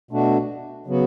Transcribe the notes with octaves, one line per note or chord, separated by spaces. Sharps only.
B2 A3 D4 F#4
C#3 F#3 B3 F#4